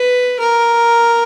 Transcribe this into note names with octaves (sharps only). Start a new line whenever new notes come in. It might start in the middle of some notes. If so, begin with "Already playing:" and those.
Already playing: B4
A#4